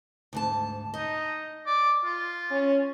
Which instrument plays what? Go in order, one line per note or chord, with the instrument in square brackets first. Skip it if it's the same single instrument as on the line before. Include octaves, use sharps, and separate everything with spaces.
[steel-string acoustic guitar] D2 G#2 A5
[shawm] D#4 [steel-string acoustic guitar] D#5
[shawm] D5
F4
[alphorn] C#4